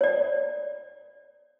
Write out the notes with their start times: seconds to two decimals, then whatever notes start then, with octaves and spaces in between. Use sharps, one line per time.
0.01 C#5 D5